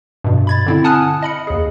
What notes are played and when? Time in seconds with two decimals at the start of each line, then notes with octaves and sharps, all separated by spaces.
0.24 G2 B2
0.47 B5 G#6 A6
0.66 D3 C4 E4
0.84 F#5 G#5 A5 D#6 F6 F#6
1.23 D#5 B5 C#7
1.47 D#2 G#4